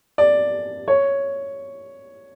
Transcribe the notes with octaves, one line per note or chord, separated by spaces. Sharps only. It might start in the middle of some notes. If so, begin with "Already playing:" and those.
D5
C#5